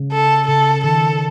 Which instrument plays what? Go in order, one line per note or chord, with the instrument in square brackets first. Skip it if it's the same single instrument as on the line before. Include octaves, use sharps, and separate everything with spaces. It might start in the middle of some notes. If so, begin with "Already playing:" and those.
Already playing: [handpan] C#3
[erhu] A4
[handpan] C#3 [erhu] A4
[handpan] D#3 [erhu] A4